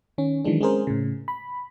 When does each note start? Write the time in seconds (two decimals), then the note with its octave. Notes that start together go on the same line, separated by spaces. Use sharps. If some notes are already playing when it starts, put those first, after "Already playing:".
0.18 D#3 C#4
0.44 D#3 E3 F#3 G#3 D4
0.61 G#3 C4 C#4 G#4 A#4 C5
0.87 A2 C#3
1.28 B5